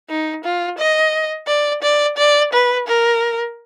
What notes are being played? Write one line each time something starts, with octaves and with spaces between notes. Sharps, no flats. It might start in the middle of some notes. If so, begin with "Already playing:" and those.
D#4
F4
D#5
D5
D5
D5
B4
A#4